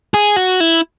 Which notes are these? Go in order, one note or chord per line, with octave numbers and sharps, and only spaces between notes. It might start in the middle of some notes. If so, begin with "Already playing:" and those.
G#4
F#4
E4